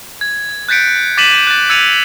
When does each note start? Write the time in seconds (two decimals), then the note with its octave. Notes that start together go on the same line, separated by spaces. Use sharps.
0.21 G#6
0.69 F#6 G6 A6 B6 C#7 D7
1.18 D6 A6 B6 D#7 E7 F#7
1.47 F#6 A6
1.70 E6 G#6 A6 C#7 D#7 F7